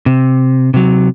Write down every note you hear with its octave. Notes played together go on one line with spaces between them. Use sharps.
C3
C3 F#3